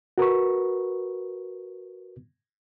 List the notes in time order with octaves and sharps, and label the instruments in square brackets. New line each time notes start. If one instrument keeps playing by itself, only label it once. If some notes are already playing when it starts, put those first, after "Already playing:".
[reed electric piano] F#4 A#4 B4 C#6